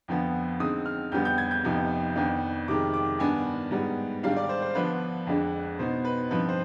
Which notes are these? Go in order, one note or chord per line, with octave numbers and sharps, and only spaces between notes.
F2 D3 F3 B3
D3 G#3 C4 D#4 D#6
F6
F2 D3 G3 B3 G6
G6
G#6
G6
F2 C3 F3 B3 D#4
F2 D#3 B3 D4
F2 C3 D#3 G#3 D6
D6
G2 D#3 B3 D4 G#5
G#2 G3 B3
G#2 D#3 G3 D4 F5
D5
C5
C5
D3 F3 B3 D4 B4
F2 D3 G#3 D4
B2 B3 D#4 C5
B4
G2 F3 C4 D#4 B4
C5